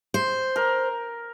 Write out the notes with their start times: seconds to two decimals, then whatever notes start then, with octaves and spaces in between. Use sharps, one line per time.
0.14 C5
0.56 A#4